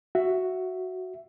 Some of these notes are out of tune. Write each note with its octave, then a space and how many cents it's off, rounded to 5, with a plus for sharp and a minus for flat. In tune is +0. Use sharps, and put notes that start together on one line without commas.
F#4 +0 E5 +10